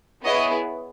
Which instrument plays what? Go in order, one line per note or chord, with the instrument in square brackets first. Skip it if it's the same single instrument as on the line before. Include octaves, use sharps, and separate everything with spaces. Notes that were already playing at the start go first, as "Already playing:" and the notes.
[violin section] B3 E4 G#4 C#5 D#5